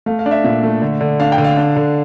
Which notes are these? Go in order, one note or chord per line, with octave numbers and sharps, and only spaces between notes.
A3 F5
F5
D4 D5
E5
A#2 E5
A3
D3
D3
D4 F5
G5
D3
F5
D4
D3